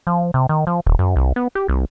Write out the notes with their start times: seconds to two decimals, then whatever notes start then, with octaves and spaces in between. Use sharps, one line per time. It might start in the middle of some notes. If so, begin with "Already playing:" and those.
0.07 F3
0.34 C3
0.49 D#3
0.67 F3
0.86 D#1
0.99 F#2
1.16 C2
1.36 B3
1.55 G4
1.68 C2